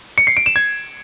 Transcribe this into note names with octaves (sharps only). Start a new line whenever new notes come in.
C#7
C7
D7
E7
G#6